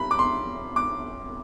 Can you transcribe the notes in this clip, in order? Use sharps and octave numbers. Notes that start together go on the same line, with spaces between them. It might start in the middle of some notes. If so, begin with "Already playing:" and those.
Already playing: F2 G3 B5
D6
C6
D6